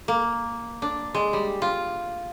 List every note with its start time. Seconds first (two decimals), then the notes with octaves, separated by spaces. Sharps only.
0.08 A#3
0.82 D4
1.15 G#3
1.33 G3
1.62 F4